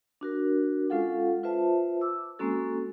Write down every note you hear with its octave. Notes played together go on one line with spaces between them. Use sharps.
D4 F#4 A#4
G#3 C#4 F4 A4 F5 F#5
F4 B4 C5 E5 A5
D6 E6
G#3 A#3 C4 C#4 F#4 A4